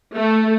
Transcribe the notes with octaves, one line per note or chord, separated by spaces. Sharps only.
A3